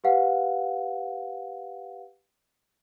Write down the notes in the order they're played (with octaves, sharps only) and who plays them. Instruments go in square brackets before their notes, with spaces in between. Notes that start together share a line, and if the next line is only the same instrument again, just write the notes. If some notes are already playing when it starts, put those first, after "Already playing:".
[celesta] G4 B4 F5 F#5